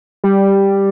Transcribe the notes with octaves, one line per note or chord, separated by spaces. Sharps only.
G3